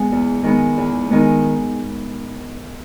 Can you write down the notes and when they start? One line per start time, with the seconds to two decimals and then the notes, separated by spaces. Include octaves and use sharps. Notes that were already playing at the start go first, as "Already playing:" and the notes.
Already playing: G#3 B3
0.12 E2
0.43 D#3 G#3 B3
0.78 E2
1.10 D#3 G#3 B3